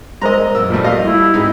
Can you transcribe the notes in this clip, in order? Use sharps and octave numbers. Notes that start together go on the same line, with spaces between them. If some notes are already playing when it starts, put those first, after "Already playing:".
G#3 G#4 A#4 C5 D#5 A#5 C6
F#2 A#2 E6
F3 G3 A3
G3 F#4 D#5 F5
E4
G#2 G#3 C4 D#4